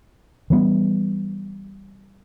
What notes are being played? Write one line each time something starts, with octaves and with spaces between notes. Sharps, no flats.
E3 G3 B3